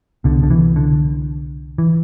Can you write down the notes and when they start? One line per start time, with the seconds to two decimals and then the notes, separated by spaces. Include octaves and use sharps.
0.24 C2 B2 D3
0.43 D3
0.50 E3
0.76 D3
1.78 E3